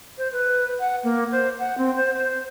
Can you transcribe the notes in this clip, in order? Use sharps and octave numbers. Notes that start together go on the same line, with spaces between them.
C5
B4
F#5
A#3
C5
F#5
C4
C5
C5